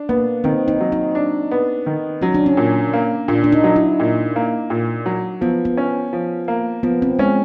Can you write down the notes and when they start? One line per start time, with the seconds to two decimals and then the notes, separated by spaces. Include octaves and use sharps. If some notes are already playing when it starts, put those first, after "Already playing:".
Already playing: D4
0.09 A#3 B3
0.44 D#3 C4
0.68 D#4
0.80 F#3
0.92 D#4
1.15 D4
1.51 B3
1.86 D#3
2.22 F#3 C#4
2.34 D4
2.46 C#4
2.57 A#2
2.93 A#3
3.28 A#2 D4
3.44 D4
3.52 D#4
3.64 F#3
3.76 E4
4.00 A#2
4.36 A#3
4.70 A#2
5.06 F#3
5.41 F3 B3
5.65 B3
5.77 C#4
6.13 F3
6.48 A#3
6.83 F3 B3
7.02 C4
7.19 G#3 C#4